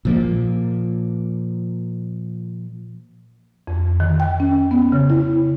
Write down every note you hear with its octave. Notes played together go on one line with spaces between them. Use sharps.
A#2 F3 A#3
F2
D#3
G5
C#4
B3
C#3
E4